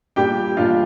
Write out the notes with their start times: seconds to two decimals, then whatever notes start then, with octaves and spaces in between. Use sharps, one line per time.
0.16 A#2 G3 D4 G4 G5
0.57 A#2 G3 D4 F4 F5